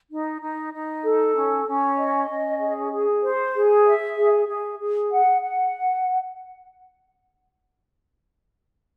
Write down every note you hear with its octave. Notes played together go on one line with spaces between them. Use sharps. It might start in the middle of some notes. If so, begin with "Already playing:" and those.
D#4
D#4
D#4
A4
C#4
C#4
D#5
C#4
G#4
G#4
C5
G#4
E5
G#4
G#4
G#4
F#5
F#5